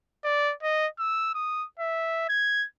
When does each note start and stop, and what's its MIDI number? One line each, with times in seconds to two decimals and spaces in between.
0.24 0.54 74
0.63 0.87 75
0.99 1.31 88
1.34 1.65 87
1.79 2.25 76
2.29 2.66 92